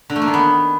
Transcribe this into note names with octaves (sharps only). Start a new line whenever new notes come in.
D3
A3
A#3
D#3
B3